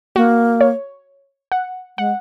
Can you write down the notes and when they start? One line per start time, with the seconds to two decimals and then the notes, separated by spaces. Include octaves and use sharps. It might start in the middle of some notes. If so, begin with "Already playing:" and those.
0.16 A#3 F#4
0.61 C#5
1.52 F#5
1.98 G#3 F#5